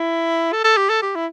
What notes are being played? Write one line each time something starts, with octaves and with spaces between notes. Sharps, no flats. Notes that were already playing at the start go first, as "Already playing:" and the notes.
Already playing: E4
A4
A4
G4
A4
G4
E4